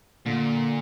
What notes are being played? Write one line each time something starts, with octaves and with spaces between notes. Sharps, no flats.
A#2 D3